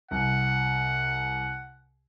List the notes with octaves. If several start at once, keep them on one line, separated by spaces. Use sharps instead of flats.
C2 F#5